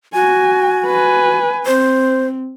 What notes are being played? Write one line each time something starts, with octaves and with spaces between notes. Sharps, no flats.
F#4 G#5
B4 G#5
C4 C5